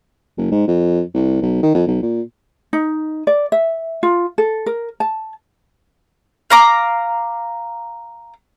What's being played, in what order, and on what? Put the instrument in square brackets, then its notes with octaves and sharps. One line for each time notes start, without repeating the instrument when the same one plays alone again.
[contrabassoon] F#1
G#2
F2
C2
B1
D#3
F2
B1
A#2
[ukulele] D#4
D5
E5
F4
A4
A#4
A5
[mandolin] F5 A#5 D6